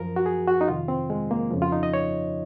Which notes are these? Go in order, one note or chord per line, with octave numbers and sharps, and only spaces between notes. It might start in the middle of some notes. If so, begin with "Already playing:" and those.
Already playing: F#2 F3 A#4
F#4
G#4
F#4
D#4
F2 C3 D#3 F4
C4
G#3
A#3
F2 C#3 F3
F4
D#4
D#5
C#5